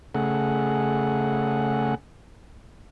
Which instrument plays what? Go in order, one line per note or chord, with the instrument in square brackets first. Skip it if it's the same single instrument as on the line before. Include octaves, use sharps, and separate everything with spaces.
[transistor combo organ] C#3 A3 G#4 F#5